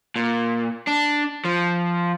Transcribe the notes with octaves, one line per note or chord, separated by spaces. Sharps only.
A#2
D4
F3